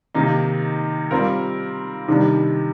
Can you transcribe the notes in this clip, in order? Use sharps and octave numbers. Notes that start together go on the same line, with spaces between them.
C3 D#3 A#3 D#4
G3 C4 F4 A#4
C3 D#3 G3 D4